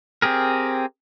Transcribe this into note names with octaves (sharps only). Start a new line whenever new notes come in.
C4 G4 G#4 A#4